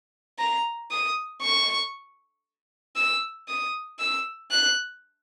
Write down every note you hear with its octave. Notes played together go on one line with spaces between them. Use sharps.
A#5
D#6
C#6
E6
D#6
E6
F#6